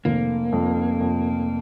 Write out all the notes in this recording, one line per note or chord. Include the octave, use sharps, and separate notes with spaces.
F1 A#3
F2
F2